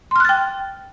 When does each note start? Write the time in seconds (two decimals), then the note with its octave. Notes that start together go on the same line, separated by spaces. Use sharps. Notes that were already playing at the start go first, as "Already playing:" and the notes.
0.11 C6
0.16 F6
0.20 F#6
0.25 A6
0.29 G5